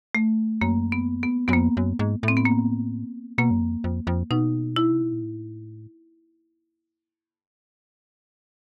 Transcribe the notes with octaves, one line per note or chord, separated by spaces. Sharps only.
A3
F#2 A#3
B3
B3
F#2 B3
F2 A#3
F#2
G#2
A2
C4
B3
A#3
B2 A#3
F#2
F2
F2
F2
B2 D#4
E4
C3
B2
A#2
A2